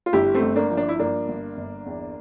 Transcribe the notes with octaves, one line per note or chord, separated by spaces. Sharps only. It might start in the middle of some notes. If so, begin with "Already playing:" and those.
F4
G1 E4 G4
A3 C4
G1
A#3 D4
F3
D4
E4
G2 A#3 D4
G1
G1
E2